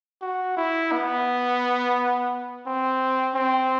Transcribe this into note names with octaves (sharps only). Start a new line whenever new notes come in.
F#4
E4
B3
C4
C4